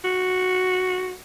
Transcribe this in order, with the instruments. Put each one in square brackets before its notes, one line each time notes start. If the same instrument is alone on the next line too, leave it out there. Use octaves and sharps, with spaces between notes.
[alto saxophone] F#4